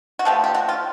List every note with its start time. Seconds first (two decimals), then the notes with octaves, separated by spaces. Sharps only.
0.19 F#4
0.25 D3 F3 A3 G4
0.44 G4
0.54 F#4
0.69 F4